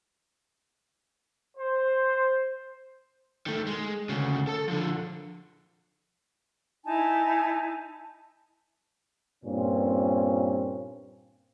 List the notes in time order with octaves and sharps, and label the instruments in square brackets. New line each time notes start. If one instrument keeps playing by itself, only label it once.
[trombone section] C5
[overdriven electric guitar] D#3 A3
G#3
D2 C#3
A4 A5
D3 F3
[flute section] D#4 E4 G#5 A5
[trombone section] G2 A#2 C4 C#4